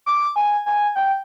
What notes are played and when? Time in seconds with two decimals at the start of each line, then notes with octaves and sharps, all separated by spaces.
0.06 D6
0.36 G#5
0.66 G#5
0.96 G5